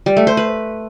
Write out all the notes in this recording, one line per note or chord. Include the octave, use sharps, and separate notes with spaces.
G3
A3
C5
B4